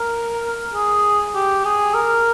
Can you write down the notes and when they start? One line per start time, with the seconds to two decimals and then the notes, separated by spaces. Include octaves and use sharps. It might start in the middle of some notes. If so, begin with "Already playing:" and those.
Already playing: A#4
0.73 G#4
1.34 G4
1.65 G#4
1.94 A#4